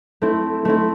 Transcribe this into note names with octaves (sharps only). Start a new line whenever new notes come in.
A3 C4 E4
A3 C4 E4